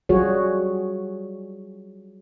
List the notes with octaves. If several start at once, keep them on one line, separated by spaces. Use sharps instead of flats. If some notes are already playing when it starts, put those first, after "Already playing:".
F#3 G3 F4 F#4 G#4 C#5